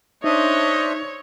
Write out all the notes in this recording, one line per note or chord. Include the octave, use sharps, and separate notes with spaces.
D4 D#4 C5 C#5 D#5 E5